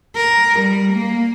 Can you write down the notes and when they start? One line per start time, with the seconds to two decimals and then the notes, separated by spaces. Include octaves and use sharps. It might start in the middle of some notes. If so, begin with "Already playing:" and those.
0.16 A#4
0.60 G3
0.93 A#3